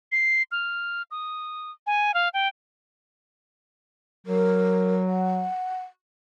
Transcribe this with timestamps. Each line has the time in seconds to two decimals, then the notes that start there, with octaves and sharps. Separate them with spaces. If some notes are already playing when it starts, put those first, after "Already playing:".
0.12 C7
0.52 F6
1.11 D#6
1.87 G#5
2.14 F5
2.34 G5
4.27 F#3 A#4
5.08 F#5